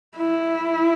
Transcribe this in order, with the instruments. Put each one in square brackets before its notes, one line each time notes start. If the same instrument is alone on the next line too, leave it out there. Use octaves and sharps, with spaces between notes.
[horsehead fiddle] E4